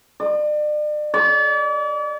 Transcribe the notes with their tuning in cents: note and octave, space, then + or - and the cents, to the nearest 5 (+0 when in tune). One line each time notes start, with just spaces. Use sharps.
D5 +40
D5 -40